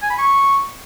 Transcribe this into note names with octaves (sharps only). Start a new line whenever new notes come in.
G#5
B5
C#6